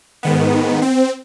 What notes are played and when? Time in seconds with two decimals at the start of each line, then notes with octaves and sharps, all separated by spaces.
0.23 G#2 D#3 B3
0.82 C4